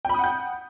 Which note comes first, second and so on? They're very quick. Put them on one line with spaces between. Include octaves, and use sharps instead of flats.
G5 B5 D#6 F#5 G6